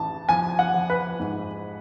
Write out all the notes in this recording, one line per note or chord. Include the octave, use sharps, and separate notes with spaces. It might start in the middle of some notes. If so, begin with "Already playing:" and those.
Already playing: A1 A5
F3 G#5
F#5
F3
B4
G#2